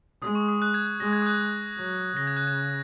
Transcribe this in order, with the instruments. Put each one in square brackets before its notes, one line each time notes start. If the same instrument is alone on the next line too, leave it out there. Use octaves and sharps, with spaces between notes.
[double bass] G#3 [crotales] D#6
[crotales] C#6
D#6
F#6
G#6
G#6
[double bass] G#3 [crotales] A#6
[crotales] G#6
D#6
F#6
[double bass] F#3
[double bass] C#3 [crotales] A#6
[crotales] G#6
F#6
G#6